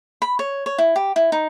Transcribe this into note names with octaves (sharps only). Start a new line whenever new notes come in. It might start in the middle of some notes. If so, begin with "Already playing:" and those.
B5
C#5
C#5
E4
G4
E4
D#4